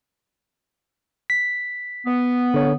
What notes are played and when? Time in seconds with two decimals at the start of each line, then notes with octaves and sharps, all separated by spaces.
1.30 B6
2.05 B3
2.54 D3 C#5